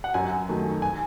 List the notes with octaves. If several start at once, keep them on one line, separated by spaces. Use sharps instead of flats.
F#5
F#2 G#5
D#3 F#3 A3
G#5